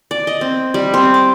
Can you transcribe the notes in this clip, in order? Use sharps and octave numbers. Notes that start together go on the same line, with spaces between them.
D5
D#5
C4
G3
C4
D6